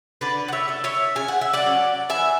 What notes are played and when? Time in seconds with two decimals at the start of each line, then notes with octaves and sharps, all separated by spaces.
0.21 D3 B4 D5
0.48 F#5
0.52 C#5 E5
0.68 A3 D4
0.84 C#5 E5
1.15 C#3 G#5
1.28 F#5
1.41 E5
1.53 D5 F#5
1.62 F#3 C#4
2.09 E3 E5 G#5